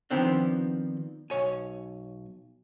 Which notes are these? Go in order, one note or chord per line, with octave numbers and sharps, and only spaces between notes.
D#3 F3 B3 C4 D4
B1 C#5 G#5